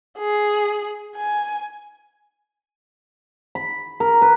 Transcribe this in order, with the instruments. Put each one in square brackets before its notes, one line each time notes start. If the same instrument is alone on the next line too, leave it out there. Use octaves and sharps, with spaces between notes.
[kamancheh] G#4
G#5
[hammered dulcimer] B5
A#4
B4